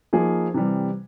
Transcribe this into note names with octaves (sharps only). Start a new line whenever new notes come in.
F3 A#3 D#4 G#4
C3 E3 G3